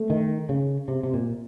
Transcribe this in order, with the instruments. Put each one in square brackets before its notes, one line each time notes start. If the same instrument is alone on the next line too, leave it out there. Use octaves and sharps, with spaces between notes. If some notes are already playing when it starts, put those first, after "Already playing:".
Already playing: [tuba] A3
[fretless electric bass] D#3
C#3
C3
C3
A#2